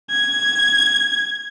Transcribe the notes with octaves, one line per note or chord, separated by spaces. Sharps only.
G#6